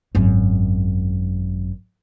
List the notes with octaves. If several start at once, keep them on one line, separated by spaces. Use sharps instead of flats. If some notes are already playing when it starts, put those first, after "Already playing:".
G#1 F#2